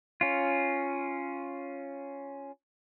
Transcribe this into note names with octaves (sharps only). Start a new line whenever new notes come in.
C#4 F4